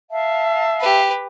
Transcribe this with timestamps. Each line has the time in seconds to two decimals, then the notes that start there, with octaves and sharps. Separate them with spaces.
0.10 E5 F5 A5
0.81 G4 B4